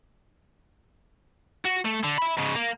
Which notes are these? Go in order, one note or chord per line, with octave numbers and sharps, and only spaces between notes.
F#4
A3
D3
E5 B5
G#2 C#3
A#3